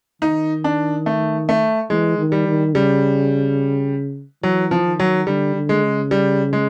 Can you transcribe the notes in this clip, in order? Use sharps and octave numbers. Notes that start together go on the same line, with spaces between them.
D#3 D#4
D4
A3
A3
E3 G#3
D#3
G3
D#3
C#3 G3
E3 F#3
F3
D#3
F#3
D3 G3
D3
G#3
C#3
G3
G#3